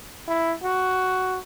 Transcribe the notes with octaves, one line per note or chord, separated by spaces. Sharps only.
E4
F#4